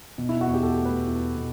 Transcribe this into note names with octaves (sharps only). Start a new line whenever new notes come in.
B2
E4
F#4
E2
G4
A4
A3
B4
E2
B2